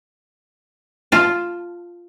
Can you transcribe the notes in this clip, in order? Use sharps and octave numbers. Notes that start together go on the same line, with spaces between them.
F4 A5